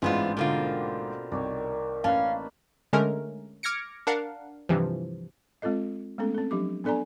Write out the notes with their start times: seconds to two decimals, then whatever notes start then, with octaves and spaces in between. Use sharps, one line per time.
0.02 A1 G#2 E3 G#3 B3 C4 D4 F4
0.37 B2 D3 A#3 F4 G4
1.32 C2 D#3 C#5 D5
2.04 A1 A#3 C#4 B4 F5 A5
2.93 D3 G#3 A3 C#4 A#4
3.63 D6 F6 G#6 A#6 C#7 D7
4.07 D4 A#4 F5 F#5
4.69 G2 C3 E3 F3
5.62 G#3 C4 F4 A4 D#5
6.18 G#3 A3 B3 C#4 A4
6.34 C4 A4
6.51 F3 F#3 D4 G4 D6
6.84 B3 D4 A4 D5 G#5 A#5